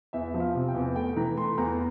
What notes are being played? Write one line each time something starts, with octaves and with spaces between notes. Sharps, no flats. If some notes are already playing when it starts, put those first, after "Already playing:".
E2 E5
F3
F5
C3
G5
E2
A3 G5
E3 A#5
A3 C6
E2 A#5